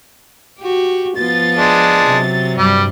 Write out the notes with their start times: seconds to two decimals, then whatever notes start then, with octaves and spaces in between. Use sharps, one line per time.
0.60 F#4 G4
1.17 F3 B3 F4 A6
1.57 G#3 D4
2.05 C3 F#3
2.58 G2 G3